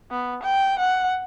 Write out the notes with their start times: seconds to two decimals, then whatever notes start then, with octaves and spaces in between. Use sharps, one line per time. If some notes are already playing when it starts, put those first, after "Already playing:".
0.11 B3
0.43 G5
0.79 F#5